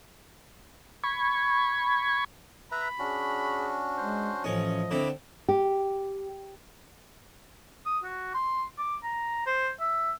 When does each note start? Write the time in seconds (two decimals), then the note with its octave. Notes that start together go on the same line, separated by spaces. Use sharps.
1.04 B5 C#6 G#6
2.72 B4 E5 A#5 B5
2.99 C#4 D4 F#4 G#4
3.98 G#3 C5
4.44 A1 F3 C#4 D#5
4.91 D3 C4 E4 B5 D6
5.48 G4
7.86 D#6
8.04 F#4
8.34 C6
8.78 D6
9.03 A#5
9.46 C5
9.80 E5